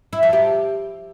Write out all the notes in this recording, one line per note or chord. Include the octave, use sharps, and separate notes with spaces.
E4
F3
G4